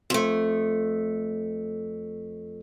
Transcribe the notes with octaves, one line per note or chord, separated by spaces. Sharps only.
F2 A3